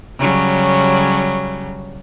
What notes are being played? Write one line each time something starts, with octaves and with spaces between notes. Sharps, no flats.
C#3 F#3 G3